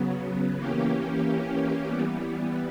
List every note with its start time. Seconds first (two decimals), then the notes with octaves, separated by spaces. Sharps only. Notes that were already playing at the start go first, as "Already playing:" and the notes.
Already playing: C#3 F#3 B3
0.54 E3 A#3 C#4 G4
1.86 E3 G3 B3